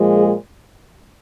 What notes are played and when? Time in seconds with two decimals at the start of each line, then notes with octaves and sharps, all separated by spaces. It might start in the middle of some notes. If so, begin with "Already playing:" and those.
Already playing: A#2 F3 G#3
0.16 G#4